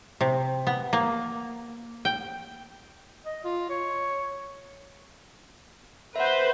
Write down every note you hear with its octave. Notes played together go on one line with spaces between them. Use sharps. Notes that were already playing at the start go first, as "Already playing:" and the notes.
C3
B3
A#3
G5
D#5
F4
C#5
B4 C5 E5 F#5